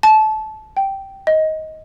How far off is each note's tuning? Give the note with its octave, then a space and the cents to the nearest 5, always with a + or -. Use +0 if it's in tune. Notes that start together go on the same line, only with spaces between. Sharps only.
A5 -25
G5 -10
D#5 +15